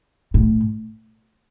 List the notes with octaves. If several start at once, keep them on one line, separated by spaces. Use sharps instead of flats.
A2